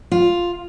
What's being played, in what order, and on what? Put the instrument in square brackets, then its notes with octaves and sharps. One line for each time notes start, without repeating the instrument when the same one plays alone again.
[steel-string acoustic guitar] F4